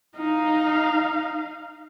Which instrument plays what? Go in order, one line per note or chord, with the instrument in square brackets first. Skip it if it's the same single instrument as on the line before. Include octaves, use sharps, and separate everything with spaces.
[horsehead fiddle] D#4 F5